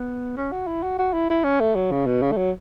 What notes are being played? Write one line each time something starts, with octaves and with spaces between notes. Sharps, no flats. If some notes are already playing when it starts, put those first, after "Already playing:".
Already playing: B3
C#4
F#4
E4
F#4
F#4
E4
E4
C#4
A3
F#3
C#3
B2
C#3
A3
F#3